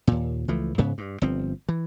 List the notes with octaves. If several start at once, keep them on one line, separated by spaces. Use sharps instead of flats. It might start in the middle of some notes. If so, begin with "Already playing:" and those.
D#2 A#2
C#2 E3 F3 A3
G#2 C#3 B3
G2
G1 F3 C4
E3